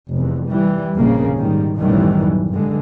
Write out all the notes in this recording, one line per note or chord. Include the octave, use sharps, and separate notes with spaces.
F1 E2
E3 G3
F1 A#1 C#3 A#3
G#2 D#3 G3
B1 F#2 A2 D#3 E3 G3
G2 D3 G#3